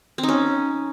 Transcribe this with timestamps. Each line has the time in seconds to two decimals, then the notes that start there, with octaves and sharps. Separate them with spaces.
0.18 C4
0.23 D#4
0.28 C#4